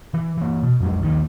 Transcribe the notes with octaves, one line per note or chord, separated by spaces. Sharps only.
E3
E3 A#3
B2
F2 F#3 G#3
A#1 D#2 A#2 D#3